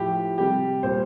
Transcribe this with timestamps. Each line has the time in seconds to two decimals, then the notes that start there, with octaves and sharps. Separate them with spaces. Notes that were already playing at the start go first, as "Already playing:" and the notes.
Already playing: A2 F3 G4
0.38 C3 G3 G4
0.83 A#2 G3 C5